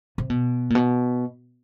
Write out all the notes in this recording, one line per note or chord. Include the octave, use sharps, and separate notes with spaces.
C3
B2
A#2
B2